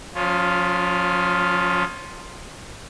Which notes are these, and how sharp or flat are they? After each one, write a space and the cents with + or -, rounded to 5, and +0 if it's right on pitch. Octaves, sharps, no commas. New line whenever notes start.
F3 +40 C#4 +15 F4 +0